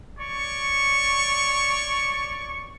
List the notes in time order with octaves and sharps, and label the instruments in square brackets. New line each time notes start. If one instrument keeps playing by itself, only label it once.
[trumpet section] C#5 D5 C#6